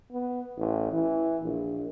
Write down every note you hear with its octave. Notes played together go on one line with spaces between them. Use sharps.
B3
A1
E3
A#1